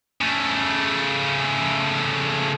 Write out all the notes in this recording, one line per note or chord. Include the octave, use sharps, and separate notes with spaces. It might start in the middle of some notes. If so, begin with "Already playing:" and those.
C#3 A3